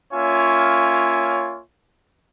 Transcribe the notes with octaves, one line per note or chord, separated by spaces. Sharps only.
A#3 C#4 F4 C#5 E5 G#5